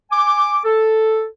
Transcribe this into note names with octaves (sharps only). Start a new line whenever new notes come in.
G#5 D6
A4